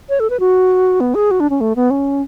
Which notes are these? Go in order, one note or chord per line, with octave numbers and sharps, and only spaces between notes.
C#5
A4
B4
F#4
B3
G#4
F#4
D4
C#4
A3
B3
C#4